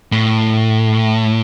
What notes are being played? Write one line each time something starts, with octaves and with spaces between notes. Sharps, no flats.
A2